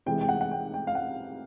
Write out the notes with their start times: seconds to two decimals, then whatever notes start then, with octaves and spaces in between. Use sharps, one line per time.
0.06 C3 E3 G#3 G5
0.21 G5
0.29 F#5
0.41 F#5
0.51 G5
0.74 G5
0.87 F5
0.95 F#5